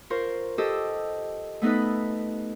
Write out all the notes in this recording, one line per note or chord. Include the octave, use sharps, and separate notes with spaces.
F4 A#4 C5 C#6
G4 A4 C5 D#5 E6
A3 B3 D#4 A4 B4